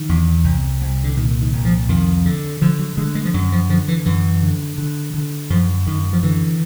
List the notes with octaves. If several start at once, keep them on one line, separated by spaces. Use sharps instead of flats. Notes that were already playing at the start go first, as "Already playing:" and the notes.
Already playing: D#3
E2
C2
C2
D3
A#2 D#3
D#3
C2
F3
F2 D#3
D3
D3 F3
F#3
D3 G#3
G#3
F3
F#2 F#3
F3
D3 F3
E3
F#2 E3
D3
D3
D3
F#2 F3
F#2 D#3
F3
D3 E3